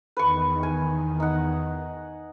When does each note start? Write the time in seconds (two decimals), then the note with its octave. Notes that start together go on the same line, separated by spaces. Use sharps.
0.17 E2 D#3 B4 C#6
0.63 G#5
1.20 D#4 F#5